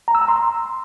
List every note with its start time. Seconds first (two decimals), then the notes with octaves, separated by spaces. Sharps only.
0.08 A#5
0.15 E6
0.22 A#5
0.28 C6